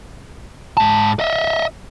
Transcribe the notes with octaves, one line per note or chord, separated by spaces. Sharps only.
G#2 A5
D#5 E5